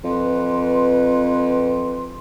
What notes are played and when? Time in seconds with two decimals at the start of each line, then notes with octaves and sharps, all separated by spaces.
0.04 F2 B4 C6